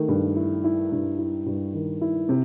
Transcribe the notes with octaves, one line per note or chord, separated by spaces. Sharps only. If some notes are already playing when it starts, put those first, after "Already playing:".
Already playing: D#3 A3
G2
E4
E4
G2
E4
G2
D#3
E4
C3